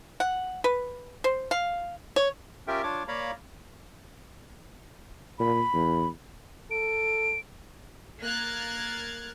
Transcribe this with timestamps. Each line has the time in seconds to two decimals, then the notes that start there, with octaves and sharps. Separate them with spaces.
0.20 F#5
0.64 B4
1.24 C5
1.51 F5
2.16 C#5
2.67 C#4 F4 G4 A#4 E5 G5
2.83 D4 F4 C#5 D6
3.08 A#3 C#5 D5 F5 A#5 B5
5.39 A#2 B5
5.74 E2
6.71 A4 D7
8.21 A#3 F6 F#6 G#6 A6